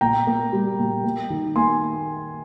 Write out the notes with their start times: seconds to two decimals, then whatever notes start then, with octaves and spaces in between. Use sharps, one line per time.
0.01 A#2 G5 A#5
0.27 A#3
0.52 G3
0.79 A#2
1.04 A#3
1.30 D#3
1.56 A#3 G#5 C6